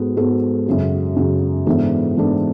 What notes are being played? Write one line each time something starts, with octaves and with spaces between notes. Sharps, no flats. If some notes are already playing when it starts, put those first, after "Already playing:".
Already playing: G#2 G#3 B3 F#4 A4
G#2 G#3 B3 F#4 A4
F#2 C#3 F#3
F#2 C#3 F#3
G#2 E3 B3 D4 A4
G#2 E3 B3 D4 A4